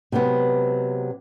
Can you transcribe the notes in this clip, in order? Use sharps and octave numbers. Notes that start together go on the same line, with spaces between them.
C3 F#3 G#3 B3